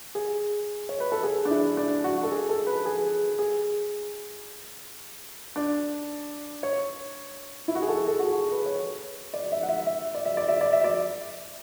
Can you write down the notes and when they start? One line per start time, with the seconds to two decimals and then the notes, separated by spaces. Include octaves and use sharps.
0.15 G#4
0.89 C#5
1.00 B4
1.12 A4
1.23 G#4
1.45 D4
1.51 E4
1.77 D4
2.04 F#4
2.23 A4
2.31 G#4
2.49 A4
2.66 B4
2.85 G#4
3.38 G#4
5.56 D4
6.63 C#5
7.68 E4
7.75 F#4
7.82 G#4
7.89 A4
8.07 A4
8.19 F#4
8.26 G#4
8.52 B4
8.66 C#5
9.33 D5
9.52 E5
9.63 F#5
9.69 E5
9.87 E5
10.15 D5
10.25 E5
10.37 D5
10.48 E5
10.61 D5
10.73 E5
10.84 D5